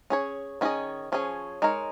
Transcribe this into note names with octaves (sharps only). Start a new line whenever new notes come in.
C#4 G#4 C#5
D#3 C#4 F4 G#4 D#5
F3 C#4 G#4 C#5
G#3 D#4 A#4 C#5